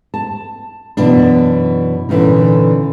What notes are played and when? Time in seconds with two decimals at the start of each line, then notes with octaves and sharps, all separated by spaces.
0.14 A5
0.97 F#2 B2 E3 D4
2.09 A#2 D3 E3 C#4 D#4